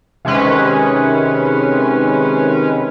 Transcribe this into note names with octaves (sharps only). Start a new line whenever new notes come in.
C3 D#3 G#3 C#4 B4